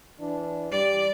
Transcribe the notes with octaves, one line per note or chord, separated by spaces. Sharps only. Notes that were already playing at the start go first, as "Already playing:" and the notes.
E3 D4
G3 D5